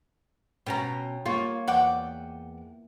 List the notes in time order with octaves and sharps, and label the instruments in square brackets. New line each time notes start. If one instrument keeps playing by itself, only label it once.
[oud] B2 C#4 [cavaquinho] G5 A#5
[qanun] A#3 C#5 [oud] F4
[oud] E2 [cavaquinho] F#5 G5 D6